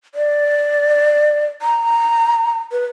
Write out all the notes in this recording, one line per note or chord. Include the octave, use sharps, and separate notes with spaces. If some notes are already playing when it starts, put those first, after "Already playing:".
D5
A#5
B4